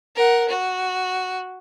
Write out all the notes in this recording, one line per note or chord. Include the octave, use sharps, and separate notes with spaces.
A#4 F#5
F#4